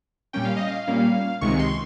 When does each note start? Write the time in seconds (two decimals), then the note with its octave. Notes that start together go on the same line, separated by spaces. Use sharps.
0.33 A#2 G3 A#3 C#4 G5
0.45 F5
0.57 D#5
0.68 F5
0.87 A#2 G3 A#3 C#4
1.41 C#2 C3 D#3 G#3 C#6
1.59 C6